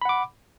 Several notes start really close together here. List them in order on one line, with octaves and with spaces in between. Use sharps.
B5 F#5 D6